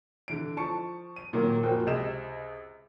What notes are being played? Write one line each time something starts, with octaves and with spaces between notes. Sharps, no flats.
D3 E3 D7
F3 A5 C#6 C#7
D#7
A#2 D#3 F#3 A#3
F#1 F3 A#3 F#4 G5
C#2 C3 D#5 E6 E7